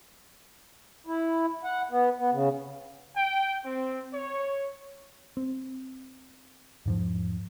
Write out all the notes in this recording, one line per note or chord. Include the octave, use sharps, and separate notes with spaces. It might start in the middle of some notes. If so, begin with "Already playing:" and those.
E4
F#5
B3
B3
C#3
G5
C4
C#5
C4
E2 G#2 F3